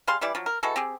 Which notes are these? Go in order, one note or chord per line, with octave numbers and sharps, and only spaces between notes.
G3 G#4 F5 C6
E3 G3 E4 D5
F3 F#3
A#4
E3 G#3 F#4 A4
C4 G4 G#4